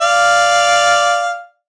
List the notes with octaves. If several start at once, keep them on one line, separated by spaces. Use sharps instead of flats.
D5 F5